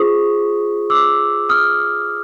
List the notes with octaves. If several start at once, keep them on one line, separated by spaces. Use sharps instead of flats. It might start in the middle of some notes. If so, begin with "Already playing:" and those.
Already playing: F4 G#4 C5 C#6 D#6
D6 E6
D#6 F6